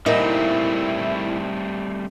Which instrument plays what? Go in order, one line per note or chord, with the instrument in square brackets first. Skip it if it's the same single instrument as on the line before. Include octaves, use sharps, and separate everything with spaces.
[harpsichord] A#2 [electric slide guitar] G3 A3 C4 [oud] D#4 [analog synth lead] E4